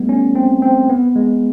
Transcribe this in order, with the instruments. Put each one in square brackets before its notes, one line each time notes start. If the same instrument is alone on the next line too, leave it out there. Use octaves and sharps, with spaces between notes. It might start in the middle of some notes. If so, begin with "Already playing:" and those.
Already playing: [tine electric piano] G3 A3 B3
C#4
C4
C4
B3
G#3